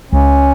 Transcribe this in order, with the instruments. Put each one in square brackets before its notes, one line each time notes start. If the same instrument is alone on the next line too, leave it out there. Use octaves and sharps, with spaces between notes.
[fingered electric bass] C#2 [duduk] C#4